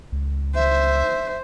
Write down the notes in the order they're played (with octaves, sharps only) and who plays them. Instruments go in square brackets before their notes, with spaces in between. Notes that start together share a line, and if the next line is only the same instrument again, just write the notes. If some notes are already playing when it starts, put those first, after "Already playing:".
[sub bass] C#2
[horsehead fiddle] C5 [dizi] E5